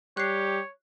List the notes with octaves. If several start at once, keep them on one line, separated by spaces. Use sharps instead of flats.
G3 G4 C#5 F#6 C7